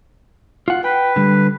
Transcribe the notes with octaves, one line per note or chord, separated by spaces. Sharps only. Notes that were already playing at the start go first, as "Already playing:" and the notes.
F4 F#5
B4 G5
D3 G3